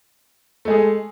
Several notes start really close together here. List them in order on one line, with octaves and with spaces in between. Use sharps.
A3 G#3 G#4